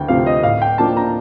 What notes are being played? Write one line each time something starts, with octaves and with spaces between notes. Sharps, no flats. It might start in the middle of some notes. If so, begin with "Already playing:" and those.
Already playing: D2 G5
C3 F3 A3 C4 F5
D#5
A2 F5
G5
F3 A#3 D4 A5
A#5